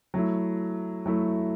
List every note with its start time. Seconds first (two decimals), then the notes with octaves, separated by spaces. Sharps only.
0.14 F#3 A3 E4
1.06 F#3 A3 E4